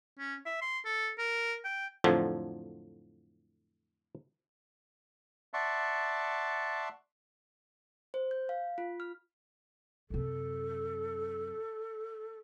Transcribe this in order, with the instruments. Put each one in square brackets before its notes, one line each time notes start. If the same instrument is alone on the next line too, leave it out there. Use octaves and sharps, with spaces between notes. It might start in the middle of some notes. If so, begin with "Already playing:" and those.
[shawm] C#4
E5
C6
A4
A#4
G5
[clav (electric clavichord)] F2 A2 D3 F3 F#3
[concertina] D5 E5 F#5 A5 C6 C#6
[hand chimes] C5
G6
F5
F4
F6
[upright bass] F#2 C3 [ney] A4